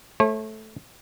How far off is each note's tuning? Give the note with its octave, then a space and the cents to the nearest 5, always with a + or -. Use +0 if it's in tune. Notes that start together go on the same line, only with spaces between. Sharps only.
A3 -10 C#5 -40